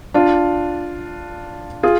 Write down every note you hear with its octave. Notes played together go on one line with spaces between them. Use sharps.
D4 F4
F4 G#4